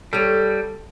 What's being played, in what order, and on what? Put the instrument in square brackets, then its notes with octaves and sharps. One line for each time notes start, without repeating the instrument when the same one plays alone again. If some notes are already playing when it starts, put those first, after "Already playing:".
[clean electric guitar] G3 [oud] A4 C#5